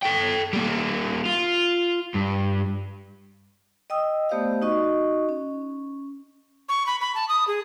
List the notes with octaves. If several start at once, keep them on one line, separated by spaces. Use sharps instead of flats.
A4 G5
G3 A#3
F4
G2
D#5 G5 D#6 E6
A3 B3 G4 C5 D5 F5
D#4 F#4 D#5 C#6
C#4
C#6
B5
B5
A5
D#6
G#4